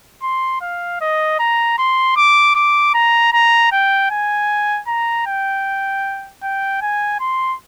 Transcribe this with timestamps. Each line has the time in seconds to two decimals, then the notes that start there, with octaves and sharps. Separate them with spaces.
0.22 C6
0.61 F5
1.01 D#5
1.39 A#5
1.78 C6
2.17 D6
2.55 D6
2.94 A#5
3.33 A#5
3.72 G5
4.10 G#5
4.87 A#5
5.27 G5
6.43 G5
6.81 G#5
7.20 C6